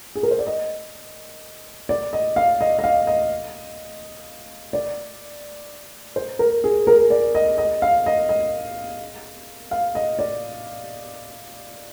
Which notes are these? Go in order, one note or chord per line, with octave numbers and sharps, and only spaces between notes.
G#4
A#4
C5
D5
D#5
D5
D#5
F5
D#5
D#5
F5
D#5
D5
C5
A#4
G#4
A#4
D5
D#5
D#5
F5
D#5
D#5
F5
D#5
D5